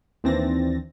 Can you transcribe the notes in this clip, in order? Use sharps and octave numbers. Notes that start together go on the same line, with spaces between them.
D#2 E3 C4 D4 A6 A#6